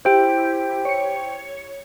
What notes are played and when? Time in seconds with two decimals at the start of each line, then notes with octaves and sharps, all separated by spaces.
0.05 E4 G4 C5 G5
0.85 C#5 C#7